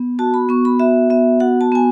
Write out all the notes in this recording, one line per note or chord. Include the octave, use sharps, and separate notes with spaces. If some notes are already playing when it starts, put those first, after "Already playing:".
Already playing: B3
F#4 A5
B5
B3 C#6
B5
F#4 E5
B3 E5
F#4 F#5
A5
B3 G#5